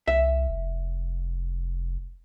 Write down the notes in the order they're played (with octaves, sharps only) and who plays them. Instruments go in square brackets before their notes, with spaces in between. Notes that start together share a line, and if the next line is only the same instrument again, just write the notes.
[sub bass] C2 [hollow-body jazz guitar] E5
[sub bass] F1